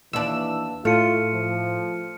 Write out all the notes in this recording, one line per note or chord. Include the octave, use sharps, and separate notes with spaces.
D#2 E3 D4 E6
A2 A3 F4 F6 C#7 D#7
F3